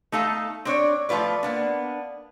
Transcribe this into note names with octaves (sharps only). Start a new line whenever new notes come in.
A3 D#4 A4 F5 A5
C4 D4 C#5
F3 A3 F4 B4 D5
A#3 B3 D4